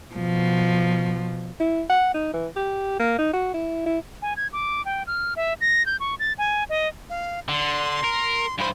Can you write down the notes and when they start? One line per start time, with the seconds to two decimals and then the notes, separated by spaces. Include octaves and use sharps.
0.15 B2 F3
1.60 E4
1.90 F#5
2.14 D#4
2.34 E3
2.56 G4
3.00 A#3
3.19 D#4
3.34 F#4
3.54 E4
3.86 E4
4.22 G#5
4.37 G#6
4.53 D6
4.85 G5
5.07 F6
5.36 E5
5.61 A#6
5.86 G6
6.00 C#6
6.19 A6
6.38 G#5
6.69 D#5
7.10 F5
7.48 D3 C6
8.03 A#4
8.59 G2 C5 B5